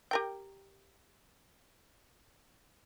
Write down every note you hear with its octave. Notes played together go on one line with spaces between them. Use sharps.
G4 A#4 G5